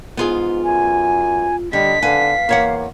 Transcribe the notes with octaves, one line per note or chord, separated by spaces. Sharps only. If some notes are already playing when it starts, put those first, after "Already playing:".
G#2 B3 F4 G#4
F#2 G#5
D3 G3 D#5 B6
D3 B4 F5 G#5
E2 A#3 C#5 F#5